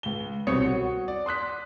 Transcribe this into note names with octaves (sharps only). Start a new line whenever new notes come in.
C#2 G7
C2 B2 C4 C#5 D#6 C#7
F#4
D5
C6 D#6 F#6 B6